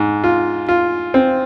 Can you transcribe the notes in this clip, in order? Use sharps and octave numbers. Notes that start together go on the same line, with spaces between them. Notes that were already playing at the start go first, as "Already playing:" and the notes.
Already playing: G#2
F4
F4
C4